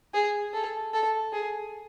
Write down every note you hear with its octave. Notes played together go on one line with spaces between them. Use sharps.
G#4
A4
A4
G#4